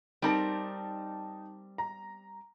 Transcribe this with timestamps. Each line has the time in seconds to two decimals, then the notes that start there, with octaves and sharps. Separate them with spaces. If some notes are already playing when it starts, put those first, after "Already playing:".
0.22 G3 C4 D#4 A#4 A5
1.78 A#5